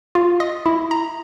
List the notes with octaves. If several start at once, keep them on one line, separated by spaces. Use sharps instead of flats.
F4
D#5
E4
A#5